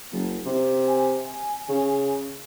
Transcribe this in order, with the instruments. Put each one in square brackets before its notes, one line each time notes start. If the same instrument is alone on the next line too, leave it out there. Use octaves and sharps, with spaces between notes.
[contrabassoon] F#1
C3
[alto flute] G#5
[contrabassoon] C#3